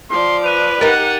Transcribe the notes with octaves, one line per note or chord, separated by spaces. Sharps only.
F3 D5 C6
B4 F#6 D#7 F7
D#4 G4 A#4 F#5 A6